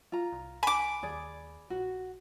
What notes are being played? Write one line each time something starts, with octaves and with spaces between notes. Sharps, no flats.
F4 A#5
C2
G#5 B5 D6
D#2 G#4 D5
A#1 F#4